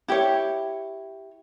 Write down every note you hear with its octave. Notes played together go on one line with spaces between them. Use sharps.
E4 G4 C#5